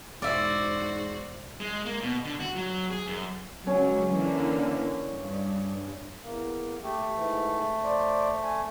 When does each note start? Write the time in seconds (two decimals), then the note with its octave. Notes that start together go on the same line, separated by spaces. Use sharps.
0.22 E1 G#2 F#4 C5 D5 E5
1.60 G#3
1.85 A#3
2.01 B2
2.25 D3
2.40 F#4
2.56 F#3
2.91 G#4
3.08 F#2
3.67 C#2 F#3 C#4
4.13 D3 E3 A#3
5.10 G2
6.23 E2 A#3
6.83 A3 G4
7.16 G#2 E3
7.83 C5 D5
8.43 G#5